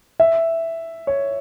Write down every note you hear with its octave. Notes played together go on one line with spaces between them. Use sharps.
E5
C#5